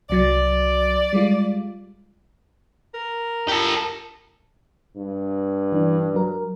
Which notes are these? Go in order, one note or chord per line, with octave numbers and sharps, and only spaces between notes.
C2 F#3 D5 A6
G3 G#3 F4
A#4
G4 A4
G2
E3 D4
F#3 A#4